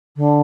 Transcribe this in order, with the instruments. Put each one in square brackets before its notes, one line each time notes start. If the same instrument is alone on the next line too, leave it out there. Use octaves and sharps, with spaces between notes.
[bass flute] D3